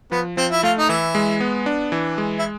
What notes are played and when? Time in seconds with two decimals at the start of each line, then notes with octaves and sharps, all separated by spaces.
0.11 F3 B3
0.37 F3 C4
0.51 E4
0.63 A3 F4
0.78 D#4
0.89 E3 E4
1.15 G#3
1.40 B3
1.66 D4
1.92 E3
2.18 G#3
2.39 E4